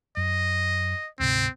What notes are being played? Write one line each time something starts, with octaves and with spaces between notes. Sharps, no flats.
F#2 D#5
D2 G#2 C3 C4